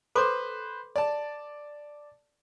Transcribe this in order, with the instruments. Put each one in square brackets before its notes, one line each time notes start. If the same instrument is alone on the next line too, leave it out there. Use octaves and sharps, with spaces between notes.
[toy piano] A4 C6 D6 [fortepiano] B4 C5
[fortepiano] D5 A5